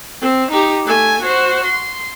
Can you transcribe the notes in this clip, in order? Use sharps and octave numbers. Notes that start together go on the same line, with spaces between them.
C4
D#4 G4
A3 G#5
F#4 C5
C6